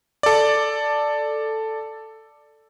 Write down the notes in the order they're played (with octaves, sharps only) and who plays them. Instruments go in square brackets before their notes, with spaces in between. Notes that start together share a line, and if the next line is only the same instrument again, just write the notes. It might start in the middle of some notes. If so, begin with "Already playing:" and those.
[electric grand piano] A4 D5